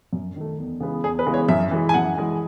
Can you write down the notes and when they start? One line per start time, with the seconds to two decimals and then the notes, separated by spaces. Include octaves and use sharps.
0.13 F#2
0.36 D#3 A3
0.58 E2
0.80 C#3 E3 G#3 B3
1.04 E2 G#4
1.19 B4
1.26 C#3 E3 G#3 B3
1.34 C#5
1.48 F#2 E5
1.71 E3 G#3
1.89 G#5
1.94 F#2 F#5
2.17 E3 G#3